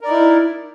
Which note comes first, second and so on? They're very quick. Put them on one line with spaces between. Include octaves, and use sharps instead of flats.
A#4 D5 D#4 E4